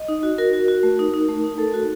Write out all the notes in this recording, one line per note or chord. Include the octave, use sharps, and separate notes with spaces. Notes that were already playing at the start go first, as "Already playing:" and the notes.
Already playing: D#5
D#4
F#4
F#4 A#4
F#4
F#4
A3
D#4
D#4
A3
D#4
A3 A4
F#4